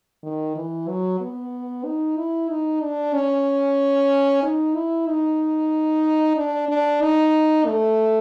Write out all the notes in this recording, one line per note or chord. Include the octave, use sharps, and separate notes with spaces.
D#3
E3
F#3
B3
D#4
E4
D#4
D4
C#4
D#4
E4
D#4
D4
D4
D#4
A3